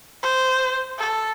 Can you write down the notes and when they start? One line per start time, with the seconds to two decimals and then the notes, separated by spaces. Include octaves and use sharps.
0.23 C5
0.98 A4